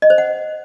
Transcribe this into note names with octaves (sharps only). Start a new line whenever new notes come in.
D#5
C5
F#5